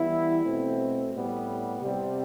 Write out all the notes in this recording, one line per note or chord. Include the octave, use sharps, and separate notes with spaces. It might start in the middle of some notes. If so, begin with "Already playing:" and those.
Already playing: E3 G3 B3 E4
B2 A3 C4
A2 G3 B3
C3 G3 C4